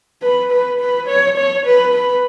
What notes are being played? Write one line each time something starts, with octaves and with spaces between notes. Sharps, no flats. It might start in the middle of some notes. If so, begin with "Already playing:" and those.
B4
B4
B4
C#5
C#5
B4
B4